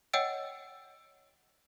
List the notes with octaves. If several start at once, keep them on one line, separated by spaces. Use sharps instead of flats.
C#5 D#5 F#5 G5 E6 D7